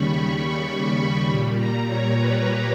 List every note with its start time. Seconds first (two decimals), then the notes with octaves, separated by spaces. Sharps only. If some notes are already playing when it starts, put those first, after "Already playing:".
Already playing: D#2 C#3 G3 B5 C#6
0.37 C#6
0.83 B5
1.27 A#2 G3 B5
1.56 A#5
1.87 C#5
2.16 B4